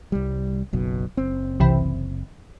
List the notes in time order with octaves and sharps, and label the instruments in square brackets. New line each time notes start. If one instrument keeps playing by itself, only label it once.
[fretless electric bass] C2 G3
F#1 B1 B2
F#1 C4
[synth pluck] C2 C3 E3